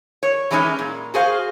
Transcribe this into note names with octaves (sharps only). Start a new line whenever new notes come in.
C#5
E3 F#3 G#3 C#4 D#4 E4
A#2
F#4 G#4 C5 F5